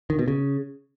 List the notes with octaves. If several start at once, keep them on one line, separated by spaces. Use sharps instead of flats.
D#3
B2
C#3